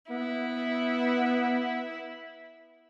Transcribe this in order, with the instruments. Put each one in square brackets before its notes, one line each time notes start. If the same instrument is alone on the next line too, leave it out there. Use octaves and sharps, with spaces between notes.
[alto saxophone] B3 [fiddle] E4